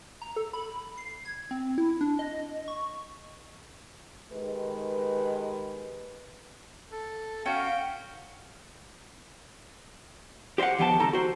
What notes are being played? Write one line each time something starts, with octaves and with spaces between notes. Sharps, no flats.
A#5
A4
B5
C7
G#6
C4
E4
D4
D#5
C#6
D#3 G#3 G4 B4
A4
C#4 F#4 F5 G5
G4 C5 D#5 F5 F#5
D#2 F3 B3 G4 G5 A5
C#2 C3 D#4 A4 A#5
F#4 C5